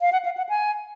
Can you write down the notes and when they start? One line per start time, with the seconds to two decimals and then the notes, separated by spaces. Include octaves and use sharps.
0.01 F5
0.12 F#5
0.25 F5
0.37 F#5
0.49 G#5